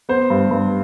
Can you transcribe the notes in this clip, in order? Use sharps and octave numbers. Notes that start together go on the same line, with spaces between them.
B3 C5
G2
G2